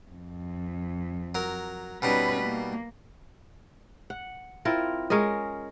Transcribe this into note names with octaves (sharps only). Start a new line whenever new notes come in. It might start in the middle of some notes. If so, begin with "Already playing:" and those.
F2
F#3 A#4
B2 G3 C#4 D#4 B4
A#3
F#5
C4 E4 F4 A#4
G#3 C#4 A#4 D#5